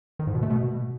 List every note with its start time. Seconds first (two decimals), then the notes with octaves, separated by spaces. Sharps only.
0.19 D#3
0.27 G#2
0.35 B2
0.43 A3
0.50 B2